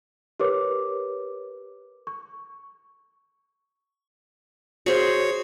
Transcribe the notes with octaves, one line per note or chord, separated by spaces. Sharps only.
G4 A#4 B4 C#5 D6
C#6
F#4 G#4 C5 C#5 C#7